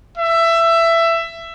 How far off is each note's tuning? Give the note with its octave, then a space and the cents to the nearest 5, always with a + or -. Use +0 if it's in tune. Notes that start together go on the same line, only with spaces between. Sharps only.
E5 +15